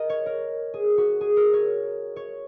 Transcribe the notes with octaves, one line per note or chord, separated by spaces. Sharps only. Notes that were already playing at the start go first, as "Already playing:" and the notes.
Already playing: A#4 D#5
C#5
A#4
G#4
F#4
G#4
A#4
C#5
C#5